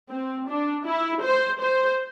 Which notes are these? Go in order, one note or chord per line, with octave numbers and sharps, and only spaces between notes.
C4
D4
E4
C5
C5